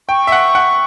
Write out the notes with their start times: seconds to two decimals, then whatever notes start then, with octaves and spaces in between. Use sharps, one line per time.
0.09 G5 C#6
0.27 E5
0.32 F#5
0.55 F#5